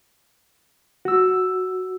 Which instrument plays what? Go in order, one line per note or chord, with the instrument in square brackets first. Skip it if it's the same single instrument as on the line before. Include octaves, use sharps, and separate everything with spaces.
[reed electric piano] F#4 E6